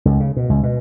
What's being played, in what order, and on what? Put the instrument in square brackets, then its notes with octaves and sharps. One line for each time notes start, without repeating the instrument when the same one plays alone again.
[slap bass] C#2
C#3
B2
C#2
B2